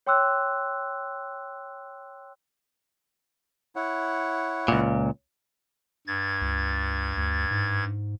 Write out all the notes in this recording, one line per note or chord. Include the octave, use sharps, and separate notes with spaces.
C#5 G5 C6 D6 E6 F#6
E4 C#5 F#5
C#2 A#2
G2 G#6 A6
C#2
D2
G#2